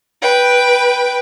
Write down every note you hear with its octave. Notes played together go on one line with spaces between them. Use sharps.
B4 G5